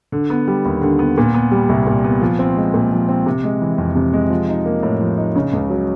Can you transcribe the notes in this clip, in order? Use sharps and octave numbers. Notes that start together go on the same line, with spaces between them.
D3
B3
G3
D#2
D3
B3
A#2
B3
G3
C2
A#2
B3
F3
C4
G#3
A#2
F3
C4
C3
G#3
E3
F2
C3
G#3
F3
D#4
A#3
A2
F3
D#4
C#3
C#2
F#3